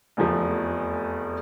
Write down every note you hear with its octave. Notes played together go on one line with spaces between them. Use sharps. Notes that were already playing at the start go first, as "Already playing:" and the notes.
F1 E2 F3 A3